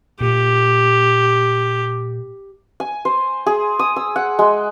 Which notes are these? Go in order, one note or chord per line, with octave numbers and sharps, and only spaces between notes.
A#2 G4
G#5
C5
G#4
D#6
E6
F#5
G#3